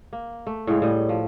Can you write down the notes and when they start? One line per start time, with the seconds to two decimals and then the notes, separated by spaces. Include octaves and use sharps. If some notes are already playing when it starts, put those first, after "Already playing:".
0.13 A#3
0.47 A3
0.67 A2 C#3 G#3 C#5
0.82 A2 G3 D#5
1.09 F3